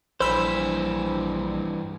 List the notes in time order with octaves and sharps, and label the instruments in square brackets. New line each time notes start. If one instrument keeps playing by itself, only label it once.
[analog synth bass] A#1 [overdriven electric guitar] G2 E3 [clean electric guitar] C5 [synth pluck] B5 E6